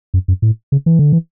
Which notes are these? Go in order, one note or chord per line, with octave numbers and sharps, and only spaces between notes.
F#2
F#2
A2
C#3
E3
D3
E3